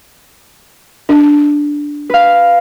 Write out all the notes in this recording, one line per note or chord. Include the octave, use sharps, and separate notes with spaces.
D4
B4 F5